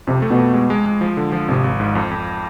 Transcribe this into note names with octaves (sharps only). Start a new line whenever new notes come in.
F2 C3
A3
B2
F2
G#3
G#3
G#3
F3
D3
F3
G#1 C3
G#1
G#2
F2
F2